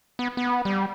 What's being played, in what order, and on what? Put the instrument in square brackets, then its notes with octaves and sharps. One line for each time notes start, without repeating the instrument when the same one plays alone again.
[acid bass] B3
B3
G3